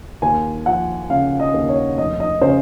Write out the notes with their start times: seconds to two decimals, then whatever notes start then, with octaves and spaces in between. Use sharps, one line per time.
0.22 D#2 G#5
0.66 F3 F#5
1.10 C#3 F5
1.40 D#5
1.54 D#2
1.69 C#5
1.97 F1 D#5
2.20 D#5
2.41 C#3 C5